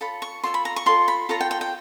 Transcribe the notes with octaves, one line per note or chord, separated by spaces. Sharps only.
F4 A4 C#5 B5
C#6
F4 A4 C#5 C6
B5
A#5
C#6
F4 A4 C#5 C6
B5
F4 A4 C#5 A#5
G5
G5
G5